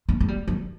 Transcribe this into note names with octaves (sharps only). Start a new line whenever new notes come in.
G#3
G#3
G3
F#3